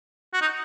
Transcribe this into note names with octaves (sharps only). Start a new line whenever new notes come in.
F#4
D#4